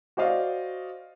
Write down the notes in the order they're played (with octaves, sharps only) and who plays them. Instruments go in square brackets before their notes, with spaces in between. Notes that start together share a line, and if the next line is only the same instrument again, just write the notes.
[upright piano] F#4 C5 D5 D#5 F5